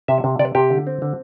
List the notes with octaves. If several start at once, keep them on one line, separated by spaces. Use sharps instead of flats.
C3 E5
C3
C3 D5
C3 G4
D3
C4
D3